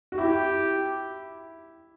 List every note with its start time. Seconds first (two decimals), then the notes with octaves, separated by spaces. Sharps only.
0.12 F#4
0.18 E4 G4